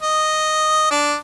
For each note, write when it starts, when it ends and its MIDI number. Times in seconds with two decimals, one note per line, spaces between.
0.02 0.86 75
0.91 1.14 62